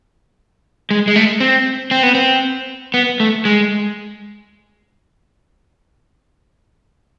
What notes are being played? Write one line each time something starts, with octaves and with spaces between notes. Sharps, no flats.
G#3
G#3
A3
C4
C4
B3
C4
B3
A3
G#3